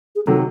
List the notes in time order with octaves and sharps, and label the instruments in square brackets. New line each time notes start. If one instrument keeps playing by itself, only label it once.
[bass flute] G#4
[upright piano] C3 D#3 F#3 [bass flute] A4